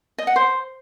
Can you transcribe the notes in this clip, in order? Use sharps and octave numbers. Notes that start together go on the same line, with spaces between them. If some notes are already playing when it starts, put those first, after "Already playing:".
D#5
F#5
C5